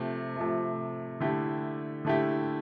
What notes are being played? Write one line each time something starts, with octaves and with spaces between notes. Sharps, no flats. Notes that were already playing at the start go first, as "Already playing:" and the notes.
Already playing: C3 F3 A3
C3 F3 A3
D3 A3 E4 G4
D3 A3 E4 G4